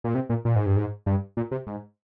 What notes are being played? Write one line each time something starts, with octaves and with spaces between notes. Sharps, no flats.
A#2
C3
A#2
A#2
G#2
G2
G#2
G2
A#2
C3
G#2